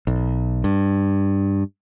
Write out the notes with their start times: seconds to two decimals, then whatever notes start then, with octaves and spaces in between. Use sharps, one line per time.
0.07 B1
0.64 G2